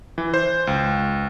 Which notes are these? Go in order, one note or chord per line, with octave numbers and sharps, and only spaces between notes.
E3
C5
C#2